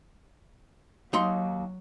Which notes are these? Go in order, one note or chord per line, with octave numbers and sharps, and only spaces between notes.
D#2 F#3 D#4 C6